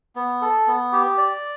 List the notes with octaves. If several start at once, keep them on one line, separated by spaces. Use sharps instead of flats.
B3
A4
B3
G4
D5